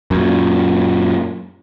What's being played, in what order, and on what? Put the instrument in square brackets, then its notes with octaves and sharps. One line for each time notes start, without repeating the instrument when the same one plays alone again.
[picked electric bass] F#2 A#2